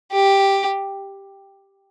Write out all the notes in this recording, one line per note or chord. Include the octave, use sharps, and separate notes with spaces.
G4